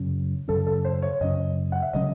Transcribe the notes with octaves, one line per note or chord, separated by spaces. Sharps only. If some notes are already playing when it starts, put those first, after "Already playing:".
Already playing: F#2 C#3 F#3 C#4
F#2 C#3 F#3 C#4 A4
A4
C5
C#5
F#2 C#3 F#3 C#4 D#5
F#5
E5
C#3 F#3 C#4 D#5